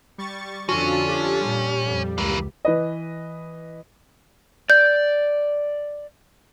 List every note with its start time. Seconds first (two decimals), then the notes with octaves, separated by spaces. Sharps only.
0.18 G3 C#6 A6
0.69 F2 D3 C#4 D4 F4 F#4 A4
1.09 G4
1.41 A#2 G3
1.85 F2
2.18 C#2 E3 A#3
2.65 E3 B4 D#5
4.70 D5 G6